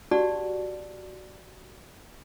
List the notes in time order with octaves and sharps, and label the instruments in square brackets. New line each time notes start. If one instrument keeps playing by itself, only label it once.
[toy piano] F#4 G4 D5 F#5 A5